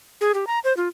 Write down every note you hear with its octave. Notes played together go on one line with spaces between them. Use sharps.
G#4
G4
A#5
C5
F4